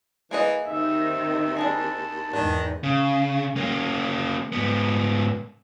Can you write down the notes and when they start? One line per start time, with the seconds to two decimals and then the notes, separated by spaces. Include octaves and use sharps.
0.31 E3 A#3 G#4 D#5
0.66 D#2 D#3 C4 D#4 E5
1.57 D4 E4 G#4 A5
2.33 E2 G#2 D#3 D4
2.83 C#3
3.56 A#3 C#4
4.52 G#2 B3